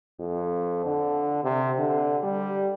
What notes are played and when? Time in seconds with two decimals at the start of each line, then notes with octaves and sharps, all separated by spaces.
0.19 F2
0.85 D3
1.43 C3
1.78 D3
2.23 G3